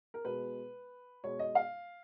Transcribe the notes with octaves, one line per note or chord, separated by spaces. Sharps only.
A#4
B2 G#3 B4
B2 G#3 C#5
D#5
F5